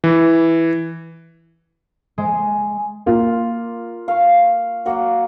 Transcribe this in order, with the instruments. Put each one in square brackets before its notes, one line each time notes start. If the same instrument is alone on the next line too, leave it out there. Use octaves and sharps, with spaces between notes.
[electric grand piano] E3
[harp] G#3
[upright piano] A#3 F4
[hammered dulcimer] F5 C#6
F#3 A#3 F#5